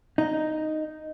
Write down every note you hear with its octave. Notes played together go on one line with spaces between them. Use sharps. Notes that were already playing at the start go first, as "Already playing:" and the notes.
D#4